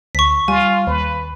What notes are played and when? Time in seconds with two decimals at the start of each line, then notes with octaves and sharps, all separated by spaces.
0.15 D2 C#6 B6
0.48 G3 F4 G#5
0.87 D#2 B4